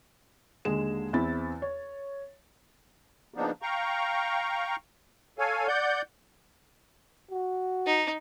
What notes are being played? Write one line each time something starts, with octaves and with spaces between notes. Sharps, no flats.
D#2 D3 G#3 G#4 E7
E2 C4 E4 B5 A6
C#5
C#3 F3 A#3 B3 D4 D#4
F5 G5 A#5 C#6
A4 C#5 F5 G#5
D5 F#5 G6
F#4
D#4